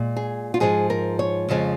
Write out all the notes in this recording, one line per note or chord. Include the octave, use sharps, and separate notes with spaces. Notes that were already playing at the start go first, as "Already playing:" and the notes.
Already playing: A#2 G#3
G#4
F4
G#2 F3 G#3 G#4
A#4
C#5
F2 C#3 F3 G#3